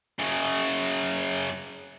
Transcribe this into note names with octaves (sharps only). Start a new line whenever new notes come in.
F#2 C#3